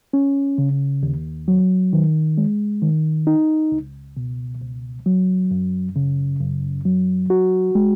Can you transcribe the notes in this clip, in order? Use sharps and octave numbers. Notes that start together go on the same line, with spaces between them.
C#4
C#3
D#2
F#3
D#3
G#3
D#3
D#4
C#2
B2
C#2
F#3
F#2
C#3
F#2
F#3
F#4
G#3